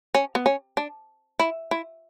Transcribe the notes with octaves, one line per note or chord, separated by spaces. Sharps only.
C#4
B3
C#4
D4
E4
E4